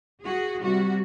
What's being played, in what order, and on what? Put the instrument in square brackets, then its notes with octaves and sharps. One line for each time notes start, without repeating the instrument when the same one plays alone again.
[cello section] F#4 G#4
C3 G3 F#4